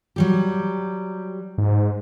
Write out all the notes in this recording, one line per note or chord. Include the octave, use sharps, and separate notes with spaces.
F#3 G3 G4
G#2